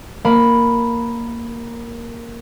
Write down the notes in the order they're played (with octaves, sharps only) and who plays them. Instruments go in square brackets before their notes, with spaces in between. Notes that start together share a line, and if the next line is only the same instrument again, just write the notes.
[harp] A#3 B5